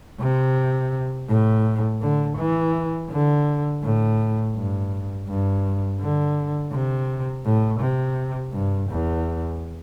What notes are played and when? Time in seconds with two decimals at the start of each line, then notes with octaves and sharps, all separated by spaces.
0.20 C3
1.28 A2
2.01 D3
2.38 E3
3.10 D3
3.83 A2
4.55 G2
5.28 G2
6.00 D3
6.72 C3
7.45 A2
7.81 C3
8.53 G2
8.90 E2